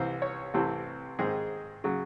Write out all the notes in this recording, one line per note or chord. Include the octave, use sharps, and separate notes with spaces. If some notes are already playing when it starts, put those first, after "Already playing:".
Already playing: C2 C3 E3 C4 C5
C#5
C2 C3 E3 A3 C4
G#2 D#3 G#3 C4 G#4
C#3 F#3